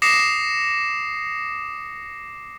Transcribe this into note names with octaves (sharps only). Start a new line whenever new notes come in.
D6 D#6 A#6 C7 C#7 E7